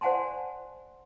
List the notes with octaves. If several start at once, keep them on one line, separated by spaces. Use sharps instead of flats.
C5 D5 F#5 G#5 A5 C6